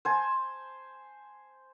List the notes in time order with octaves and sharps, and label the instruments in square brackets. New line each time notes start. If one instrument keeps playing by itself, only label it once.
[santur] C5 G#5 A5